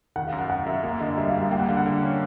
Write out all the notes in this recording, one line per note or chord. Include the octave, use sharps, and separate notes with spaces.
D#3 F#5
F5
F#2
F#5
F#2 F#5
F#2 E5
A#3 F5
D3 D#5
G3 E5
F5
G3
F5
A#3 G5
F#5
D3 F5
F#5
D3
C#4